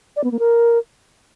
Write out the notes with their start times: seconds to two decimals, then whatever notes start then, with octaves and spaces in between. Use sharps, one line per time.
0.16 D5
0.24 B3
0.31 A#3
0.39 A#4